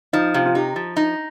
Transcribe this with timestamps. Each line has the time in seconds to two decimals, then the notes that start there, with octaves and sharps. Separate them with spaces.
0.13 F3 D#4
0.34 C3 F4
0.46 F4
0.55 D#4 G4
0.76 F3
0.97 D#4